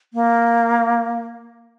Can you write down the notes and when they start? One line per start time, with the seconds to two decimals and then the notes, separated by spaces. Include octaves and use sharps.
0.13 A#3